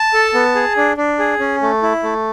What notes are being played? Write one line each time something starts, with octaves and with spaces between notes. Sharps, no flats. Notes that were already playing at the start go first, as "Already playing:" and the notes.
Already playing: A5
A4
B3
G#4
D4
D4
G#4
C#4
A3
E4
A3